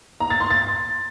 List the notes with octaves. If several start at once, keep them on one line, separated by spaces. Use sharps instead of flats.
A#5
A6
C6
A6